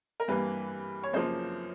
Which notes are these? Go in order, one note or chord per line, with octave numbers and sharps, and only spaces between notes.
A#4
G2 E3 G3 A#3 B4
C#5
F#2 C#3 F3 A#3 C5